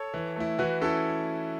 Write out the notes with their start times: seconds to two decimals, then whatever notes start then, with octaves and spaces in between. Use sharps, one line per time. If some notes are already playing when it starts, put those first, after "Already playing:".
Already playing: A4 C#5
0.14 E3
0.36 A3 E4
0.58 E3 F#4 B4
0.81 C#4 E4 A4